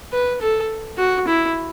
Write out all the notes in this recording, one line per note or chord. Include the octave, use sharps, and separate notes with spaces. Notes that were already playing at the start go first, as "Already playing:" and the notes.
B4
A4
F#4
E4